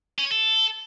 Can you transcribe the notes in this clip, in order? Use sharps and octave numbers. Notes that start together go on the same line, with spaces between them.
C#4
C#5
A4